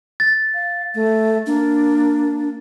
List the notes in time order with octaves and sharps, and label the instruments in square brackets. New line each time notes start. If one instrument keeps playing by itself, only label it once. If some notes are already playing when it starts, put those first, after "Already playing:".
[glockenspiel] A6
[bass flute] F5
A3
[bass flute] A#3 [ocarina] D4